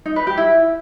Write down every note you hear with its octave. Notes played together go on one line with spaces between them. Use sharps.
D#4
B4
G4
E4